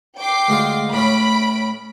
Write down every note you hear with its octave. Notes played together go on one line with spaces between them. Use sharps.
G5 D6 C7
D2 G#3 F4
A2 C#4 B5 D7